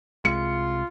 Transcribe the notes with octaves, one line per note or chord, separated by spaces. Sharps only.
C2 C3 G#3 F4 C#7